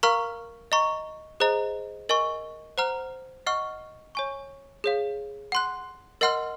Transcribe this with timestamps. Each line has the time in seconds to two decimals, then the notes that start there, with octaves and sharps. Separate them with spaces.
0.03 A#4 F5 A#5 C#6 F6
0.72 D#5 A#5 C#6
1.40 G#4 C5 D#5 A#5
2.09 A#4 D#5 G#5 C#6
2.78 C5 F#5 A#5 F6
3.47 D#5 F#5 C#6 F6
4.15 C#5 G#5 C#6
4.84 G#4 C#5 F5
5.52 F#5 C6 F#6
6.21 A#4 D#5 F#5 C6 F6